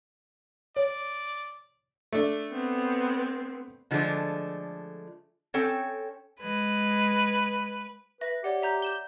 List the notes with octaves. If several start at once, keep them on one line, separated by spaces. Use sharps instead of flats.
C#5 D5
A3 D4
B3 C4
D3 F3 G#3 A3 D4
C4 C#4 A4 C#5 G5
G#3 B4
B4 E5 A#6
G4 C#5 D5 F#5
E5 A#5 G6
G6 E7 G7